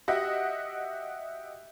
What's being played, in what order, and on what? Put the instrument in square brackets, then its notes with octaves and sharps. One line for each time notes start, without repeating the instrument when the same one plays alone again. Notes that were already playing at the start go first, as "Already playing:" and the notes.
[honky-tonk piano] F#4 G4 D#5 E5 F#5